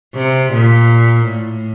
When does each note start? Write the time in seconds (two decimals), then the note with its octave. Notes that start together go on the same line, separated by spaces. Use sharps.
0.15 C3
0.53 A#2
1.28 A2